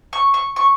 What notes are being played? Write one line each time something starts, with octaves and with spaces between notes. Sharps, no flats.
C#6
C#6
C#6